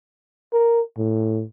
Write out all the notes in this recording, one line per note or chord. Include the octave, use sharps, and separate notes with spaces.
A#4
A2